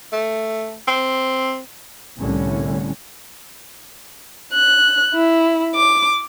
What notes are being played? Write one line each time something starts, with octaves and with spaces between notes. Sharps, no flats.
A3
C4
C2 A2 D3 G3 C#4
F#6
E4
D6